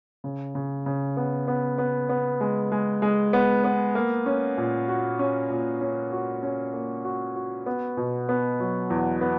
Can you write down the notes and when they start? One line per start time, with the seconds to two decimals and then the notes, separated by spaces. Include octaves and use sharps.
0.24 C#3
0.55 C#3
0.86 C#3
1.17 B3
1.48 B3
1.78 B3
2.09 B3
2.41 G#3
2.72 G#3
3.02 G#3
3.33 B3
3.64 B3
3.95 A#3
4.26 C#4
4.57 A#2
4.88 F#4
5.19 C#4
5.50 A#2
5.81 C#4
6.12 F#4
6.43 C#4
6.73 A#3
7.05 F#4
7.36 F#4
7.66 B3
7.97 B2
8.29 B3
8.60 F#3
8.90 E2
9.21 B3